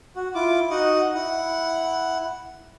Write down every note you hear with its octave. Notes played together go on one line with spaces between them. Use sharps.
F#4
E4 F4 D6
D#4 F#4 D#5 F#5
E4 F#5